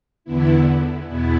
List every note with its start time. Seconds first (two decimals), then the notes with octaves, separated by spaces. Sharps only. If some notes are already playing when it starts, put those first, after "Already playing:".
0.24 E2 D3 B3 E4
1.07 E2 B2 B3 E4